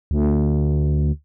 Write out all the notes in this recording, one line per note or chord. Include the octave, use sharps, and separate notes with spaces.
D2